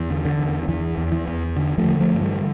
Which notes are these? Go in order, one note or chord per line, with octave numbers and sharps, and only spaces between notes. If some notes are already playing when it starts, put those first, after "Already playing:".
Already playing: E2
D3
D3
E2
E2 E3
E2
E3
E2
D3
F3 A3
D3
F3 A3
G2
E3 G3